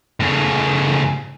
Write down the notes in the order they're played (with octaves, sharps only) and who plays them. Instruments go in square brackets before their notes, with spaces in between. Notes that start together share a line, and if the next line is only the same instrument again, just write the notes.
[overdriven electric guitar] A2 C#3